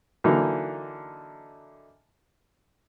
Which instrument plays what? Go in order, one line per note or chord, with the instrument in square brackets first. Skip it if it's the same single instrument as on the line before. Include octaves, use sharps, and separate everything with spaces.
[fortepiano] D3 E3 F#3 A#3 D#4